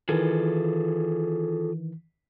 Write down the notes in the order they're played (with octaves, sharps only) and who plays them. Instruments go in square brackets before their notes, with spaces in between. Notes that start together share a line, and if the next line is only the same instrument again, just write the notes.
[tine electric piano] D#3 E3 [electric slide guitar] F4 G#4 A4